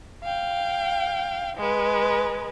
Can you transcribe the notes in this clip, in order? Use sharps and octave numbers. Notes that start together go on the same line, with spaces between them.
F5 G5
G#3 B4